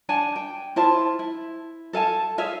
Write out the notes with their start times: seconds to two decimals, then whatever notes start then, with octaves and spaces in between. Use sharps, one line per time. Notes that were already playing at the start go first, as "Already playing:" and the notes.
0.09 D4 F#5 G#5 A5
0.36 G5
0.76 E4 F4 C5 A5
1.19 E4
1.93 A4 F5 G#5 A5
2.38 G#4 C#5 E5 F5